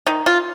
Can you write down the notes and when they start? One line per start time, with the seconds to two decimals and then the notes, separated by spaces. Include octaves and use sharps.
0.06 D#3 D#4
0.26 F4